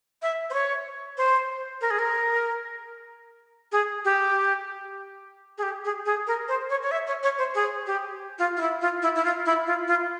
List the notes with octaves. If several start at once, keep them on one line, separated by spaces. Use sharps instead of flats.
E5
C5
C#5
C5
A#4
G#4
A#4
G#4
G4
G#4
G4
G#4
G#4
A#4
C5
C#5
C#5
E5
C#5
C#5
C5
G#4
G4
F4
F4
E4
F4
E4
E4
F4
E4
F4
F4